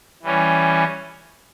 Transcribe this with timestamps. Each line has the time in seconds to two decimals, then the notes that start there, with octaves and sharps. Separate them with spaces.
0.22 E3 G3 C#4